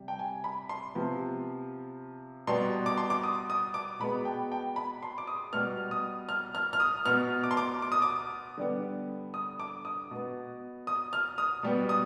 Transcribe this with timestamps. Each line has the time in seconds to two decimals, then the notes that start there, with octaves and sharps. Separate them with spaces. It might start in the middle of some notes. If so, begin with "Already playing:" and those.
Already playing: C3 G3
0.08 G5
0.19 G#5
0.44 B5
0.69 C6
0.95 C3 F3 B3
2.47 B2 G3 B3 C6
2.86 D6
2.98 C6
3.10 D6
3.23 D#6
3.50 D#6
3.74 D6
4.00 B2 G#3 B3 B5
4.25 G5
4.52 G5
4.76 B5
5.03 C6
5.18 D6
5.27 D#6
5.53 B2 G3 B3 F6
5.91 D#6
6.29 F6
6.55 F6
6.73 F6
6.80 D#6
7.06 B2 B3 F6
7.44 D6
7.51 C6
7.57 D6
7.82 D6
7.92 D#6
8.02 D6
8.57 D3 G3 B3
9.34 D#6
9.60 D6
9.85 D#6
10.11 B2 B3
10.87 D#6
11.13 F6
11.38 D#6
11.63 B2 G3 B3
11.89 D#6